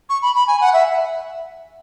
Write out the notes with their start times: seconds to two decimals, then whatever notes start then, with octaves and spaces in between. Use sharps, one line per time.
0.09 C#6
0.22 B5
0.35 B5
0.47 G#5
0.61 F#5
0.73 E5